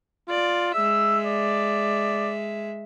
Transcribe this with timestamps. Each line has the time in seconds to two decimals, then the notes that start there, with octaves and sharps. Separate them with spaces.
0.29 F4 D5
0.75 G#3 E5 E6
1.27 D5